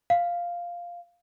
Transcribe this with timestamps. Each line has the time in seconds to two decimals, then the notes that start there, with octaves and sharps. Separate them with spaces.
0.10 F5